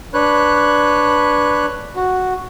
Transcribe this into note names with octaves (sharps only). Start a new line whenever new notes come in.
D4 B4 C#5 F#6
F#4